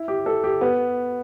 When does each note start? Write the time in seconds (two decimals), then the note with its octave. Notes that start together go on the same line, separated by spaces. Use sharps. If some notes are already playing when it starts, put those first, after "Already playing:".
Already playing: E4
0.08 G4
0.26 A4
0.44 G4
0.61 B3